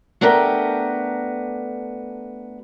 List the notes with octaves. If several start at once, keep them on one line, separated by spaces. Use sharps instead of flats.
A3 B3 D4 G4 A#4 G5